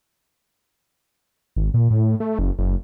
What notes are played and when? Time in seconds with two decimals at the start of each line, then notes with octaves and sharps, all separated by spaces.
1.56 G#1
1.74 A#2
1.90 A2
2.20 A3
2.39 F#1
2.59 F#1